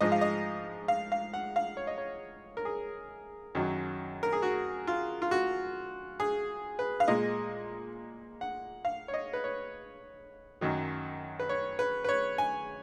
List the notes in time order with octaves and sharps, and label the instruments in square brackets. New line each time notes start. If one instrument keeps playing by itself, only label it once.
[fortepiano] G#2 F3 G#3 D#5
F5
D#5
F5
F5
F#5
F5
C#5
D#5
C#5
A#4
G#4
F#2 D#3 F#3
A#4
G#4
F#4
F4
F4
F#4
G#4
B4
F5
A#2 G#3 D#5
F#5
F5
C#5
D#5
B4
C#5
F#2 D#3 F#3
B4
C#5
B4
B4
C#5
G#5